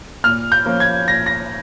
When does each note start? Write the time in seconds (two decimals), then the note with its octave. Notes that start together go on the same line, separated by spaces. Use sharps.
0.24 A#2 F6
0.52 G6
0.65 F3 A#3 C#4
0.80 G#6
1.07 A#2 A#6
1.26 A#6